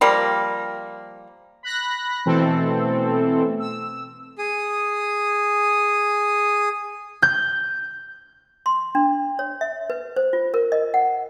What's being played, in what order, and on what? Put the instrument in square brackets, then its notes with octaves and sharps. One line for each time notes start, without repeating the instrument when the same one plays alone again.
[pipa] F3 G3 A#3
[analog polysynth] B5 F#6 A#6
B2 E3 A3 C4 A4
E6
[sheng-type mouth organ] G#4 D#6
[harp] G6
[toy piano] C6
D4
C#5
E5
B4
C5
F4
A#4
D#5
F#5